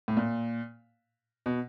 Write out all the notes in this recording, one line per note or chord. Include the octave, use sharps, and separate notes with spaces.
A2
A#2
B2